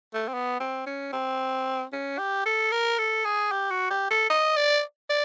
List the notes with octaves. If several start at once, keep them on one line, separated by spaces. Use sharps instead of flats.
A3
C4
B3
C4
C#4
C4
C#4
G4
A4
A#4
A4
G#4
G4
F#4
G4
A4
D#5
D5
D5